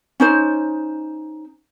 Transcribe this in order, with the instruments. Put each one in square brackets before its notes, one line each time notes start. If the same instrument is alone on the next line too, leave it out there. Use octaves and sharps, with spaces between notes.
[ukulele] C#4 D#4 C5